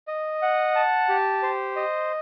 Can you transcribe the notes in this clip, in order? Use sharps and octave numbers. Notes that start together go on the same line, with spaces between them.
D#5
F#5
A5
G4
C5
D#5